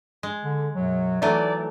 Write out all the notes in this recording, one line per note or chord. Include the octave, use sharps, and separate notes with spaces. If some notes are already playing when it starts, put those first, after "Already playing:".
G#3
D3
F#2 B2 F#3
E3 F#3 A3 D#4 D5